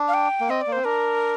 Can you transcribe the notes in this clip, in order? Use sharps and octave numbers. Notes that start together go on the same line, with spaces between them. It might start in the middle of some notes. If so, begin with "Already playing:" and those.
Already playing: D4
F5
G5
A#3
C4 D#5
D5
A#3
C4 C5
D4 A#4